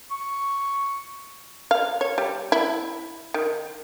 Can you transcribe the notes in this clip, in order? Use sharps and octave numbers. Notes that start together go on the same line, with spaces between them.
C#6
F5
C#5
G3
E4
D#3